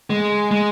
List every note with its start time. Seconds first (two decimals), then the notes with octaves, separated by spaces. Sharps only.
0.10 G#3
0.51 G#3